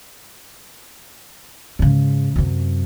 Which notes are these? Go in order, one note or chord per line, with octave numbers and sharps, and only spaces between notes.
G#2 C#3
F#2 C3